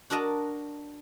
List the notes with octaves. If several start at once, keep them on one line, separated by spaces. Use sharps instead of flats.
D4 F#4 A#4 D#5 A5